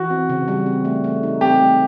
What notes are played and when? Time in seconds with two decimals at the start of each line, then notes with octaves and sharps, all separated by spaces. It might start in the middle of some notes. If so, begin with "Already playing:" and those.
Already playing: E3 F#4
0.10 C4
0.29 C#3
0.48 G3
0.66 C4
0.85 A3
1.04 A3
1.23 D#4
1.41 C4 G4
1.60 A3